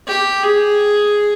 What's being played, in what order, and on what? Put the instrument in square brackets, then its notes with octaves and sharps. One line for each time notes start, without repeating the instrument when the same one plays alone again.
[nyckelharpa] G4
G#4